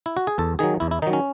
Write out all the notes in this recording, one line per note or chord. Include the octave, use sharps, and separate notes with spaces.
E4
F#4
G#4
E2 A4
D#3 F#3 G#4
E2 E4
E4
D#3 F#3 D#4
C#4